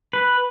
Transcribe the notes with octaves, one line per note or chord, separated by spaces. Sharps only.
B4